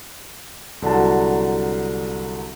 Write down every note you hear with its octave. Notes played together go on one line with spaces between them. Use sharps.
C2 D3 F#3 A5